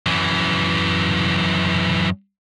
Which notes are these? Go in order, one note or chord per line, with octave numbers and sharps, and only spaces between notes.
F#2 E3